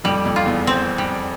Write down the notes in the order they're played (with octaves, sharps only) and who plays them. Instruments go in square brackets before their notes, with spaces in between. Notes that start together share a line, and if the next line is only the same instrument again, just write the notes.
[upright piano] F2 [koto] G3
[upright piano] F2
[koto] F4
[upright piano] E2
[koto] C4
G3